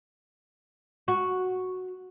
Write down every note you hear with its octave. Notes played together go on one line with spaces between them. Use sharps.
F#4